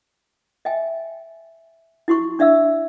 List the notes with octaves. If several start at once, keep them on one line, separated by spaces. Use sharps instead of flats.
D#5 E5 G5 G#5
E4 F#4 C6 C#6
D4 D5 E5 F5 E6